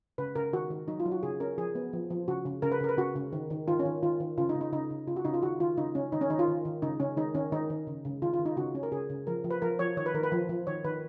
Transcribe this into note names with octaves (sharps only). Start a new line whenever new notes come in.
C#3 B4
C#3 A#4
D#3 F#4
D#3
F#3 D#4
F4
F#3
F#4
C#3 G#4
C#4 A#4
F3 G#4
B3
F3
F3
C#3 F#4
C#3
C#3 A#4
B4
C#3 A#4
B4
C#3 F#4
C#3
D#3
D#3
D#3 F4
C#4
D#3
D#3 F4
D#3
C#3 F4
D#4
C#3
D#4
C#3 D#4
C#3
C#3 F4
F#4
C#3 D#4
F4
D#3 F#4
D#3 F4
C#3 D#4
C#3 C#4
D#3 D#4
C#4
D#3 D#4
F4
D#3
D#3
C#3 D#4
C#3 C#4
D#3 D#4
D#3 C#4
D#3 D#4
D#3
C#3
C#3
D#3 F4
F4
D#3
D#4
C#3 F#4
C#4
A#4
C#3 G#4
C#3
F3 A#4
F3
B4
F3 A#4
F3 C#5
D#3 C#5
B4
D#3 A#4
B4
F3
F3
D#3 C#5
D#3 B4